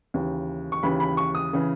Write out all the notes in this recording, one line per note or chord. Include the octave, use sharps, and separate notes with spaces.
D#2 C#3 E3
C#6
D#2 C#3 E3 B5
B5
C#6
D#6
C#3 E3